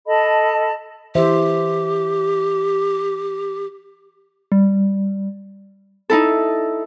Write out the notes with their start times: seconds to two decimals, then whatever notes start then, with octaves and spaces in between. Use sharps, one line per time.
0.06 A4 D#5 A5 B5
1.15 E3 G4 C5 E5
4.52 G3
6.10 D#4 E4 A4